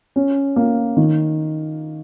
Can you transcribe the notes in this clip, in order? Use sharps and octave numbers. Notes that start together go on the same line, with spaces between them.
C#4
A#3
D#3